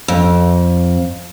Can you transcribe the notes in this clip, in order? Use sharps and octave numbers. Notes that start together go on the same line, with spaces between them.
F2